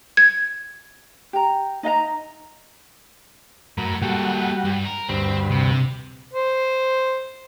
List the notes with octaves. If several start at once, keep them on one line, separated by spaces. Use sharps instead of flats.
G#6
G4 A#5
D#4 D#5 F5 A#5
F#2 A2 A#4 B5
G3 A#3 F#4 A4
G2
A#4
D2 G2 C4 B4
C3
C5